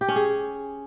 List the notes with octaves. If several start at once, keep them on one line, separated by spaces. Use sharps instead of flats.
G4
C#4
G#4